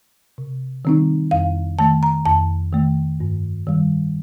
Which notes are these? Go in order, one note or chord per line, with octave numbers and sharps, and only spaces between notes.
C3
D#3 G3 C4 D#4
F2 F5
D#3 A3 A5
A#5
F2 A5
D#3 A3
G2
D#3 G3